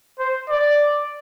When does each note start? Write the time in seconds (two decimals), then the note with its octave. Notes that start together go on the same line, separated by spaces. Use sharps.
0.19 C5
0.49 D5